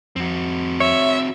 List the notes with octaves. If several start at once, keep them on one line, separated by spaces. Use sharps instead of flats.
F2 C4 F#4
C#5 E5